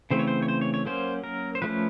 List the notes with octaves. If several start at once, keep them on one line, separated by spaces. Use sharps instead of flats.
C#3 E3 A3 C4 C5
C#5
C5
C#5
C5
C#5
C#5
F#3 A#3 C#4 C5
A#4
C5
F3 A3 C#4 B4